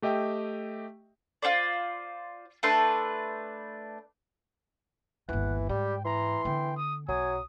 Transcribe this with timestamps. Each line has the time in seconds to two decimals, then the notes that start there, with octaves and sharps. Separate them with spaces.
0.02 A3 G4 D#5 E5 G5
1.42 F4 F#4 C5 D5
2.63 A3 D4 B4 C6
5.29 G1 D#2 E3 F#5
5.69 G#2 G3 G4 G5
6.05 E3 A#5 C6
6.45 D3 B3 G5
6.77 D#6
7.08 B1 F#3 G#5 D#6